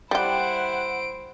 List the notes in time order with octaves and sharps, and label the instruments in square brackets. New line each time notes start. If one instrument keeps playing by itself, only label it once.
[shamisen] G3 G4 [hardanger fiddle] E4 C5 [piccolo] F#5 [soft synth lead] D7